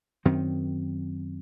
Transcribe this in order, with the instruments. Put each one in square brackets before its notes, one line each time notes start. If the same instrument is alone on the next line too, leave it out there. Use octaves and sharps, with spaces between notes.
[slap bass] F#2 D#3 C4